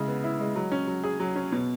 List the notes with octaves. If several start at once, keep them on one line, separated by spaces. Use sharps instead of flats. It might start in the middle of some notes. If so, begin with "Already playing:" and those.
Already playing: C#3 G#3 E4
B3
E4
G#3
F#3
C#4
F#3
G#4
F#3
C#4
B2